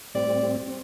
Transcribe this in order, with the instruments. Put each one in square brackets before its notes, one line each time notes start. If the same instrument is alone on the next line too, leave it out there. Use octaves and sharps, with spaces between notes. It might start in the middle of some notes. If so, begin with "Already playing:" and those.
[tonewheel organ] A2 G3 C4 [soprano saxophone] D5
[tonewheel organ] C4